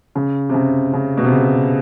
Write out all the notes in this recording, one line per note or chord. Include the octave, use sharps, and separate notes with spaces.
C#3
C3
C#3
C#3
B2
C3
C#3